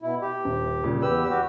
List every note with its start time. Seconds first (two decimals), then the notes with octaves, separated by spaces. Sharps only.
0.02 B2 E4
0.22 G4
0.45 D#1
0.84 A#2 C#3 G3
1.02 E2 G4 B4 E6
1.30 F#4 G4